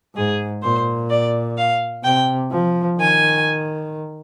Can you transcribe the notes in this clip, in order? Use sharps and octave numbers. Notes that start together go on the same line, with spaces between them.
G#2 G#4
A#2 C5
D5
F5
C3 G5
F3
D#3 G#5